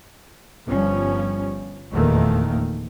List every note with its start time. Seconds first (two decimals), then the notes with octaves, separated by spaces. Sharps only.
0.68 G1 F3 G3 C#4
1.93 F1 E2 A#2 D#3 A3 A#3